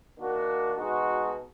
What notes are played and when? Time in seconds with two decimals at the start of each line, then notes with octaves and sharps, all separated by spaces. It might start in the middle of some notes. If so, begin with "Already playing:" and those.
0.18 D#3 A#3 D4 F#4
0.76 B2 G#3 D#4 F#4